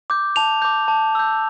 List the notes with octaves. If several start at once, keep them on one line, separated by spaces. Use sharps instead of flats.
D6 G6
A5 F7
D6 G6
A5
E6 G6